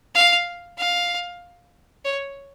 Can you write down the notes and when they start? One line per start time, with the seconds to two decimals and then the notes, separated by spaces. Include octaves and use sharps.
0.15 F5
0.78 F5
2.05 C#5